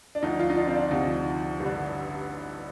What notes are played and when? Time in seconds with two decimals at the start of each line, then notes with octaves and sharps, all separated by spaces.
0.15 D4
0.22 D2 D3 F3 D#4
0.40 F4
0.50 D#4
0.57 D4
0.67 C4
0.75 D4
0.91 D2 C3 F3 D#4
1.60 A1 G2 D3